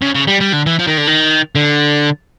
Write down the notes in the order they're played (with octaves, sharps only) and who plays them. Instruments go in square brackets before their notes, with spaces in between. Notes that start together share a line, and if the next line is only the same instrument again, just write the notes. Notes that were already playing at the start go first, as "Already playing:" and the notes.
[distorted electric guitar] C#3
C#3
G3
G3
D3
E3
F3
D#3
D3
D#3
D3